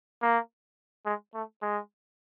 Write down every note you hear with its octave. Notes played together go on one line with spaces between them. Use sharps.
A#3
G#3
A3
G#3